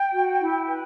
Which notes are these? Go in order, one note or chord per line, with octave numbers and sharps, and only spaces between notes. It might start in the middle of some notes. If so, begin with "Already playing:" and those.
Already playing: G5
F#4
E4
B4